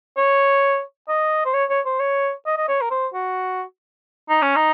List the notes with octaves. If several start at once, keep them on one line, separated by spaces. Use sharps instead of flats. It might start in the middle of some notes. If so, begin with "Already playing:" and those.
C#5
D#5
C5
C#5
C#5
C5
C#5
D#5
D#5
C#5
A#4
C5
F#4
D#4
C#4
D#4